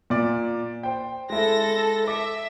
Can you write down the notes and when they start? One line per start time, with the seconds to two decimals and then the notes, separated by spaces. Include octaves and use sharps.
0.10 A#2 D5 D6
0.83 C5 G5
1.30 G#3 E4 A4 A#6
2.07 E5 D6